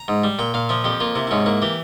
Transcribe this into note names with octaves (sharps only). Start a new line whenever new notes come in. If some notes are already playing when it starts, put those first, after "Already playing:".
Already playing: A#5
G#2
G3
A#2 G5
A#2 F5
F3 E5
F2 G4
A#3 F4
C3 E4
E4
G#2 C#4
A#3 E4
E3 G4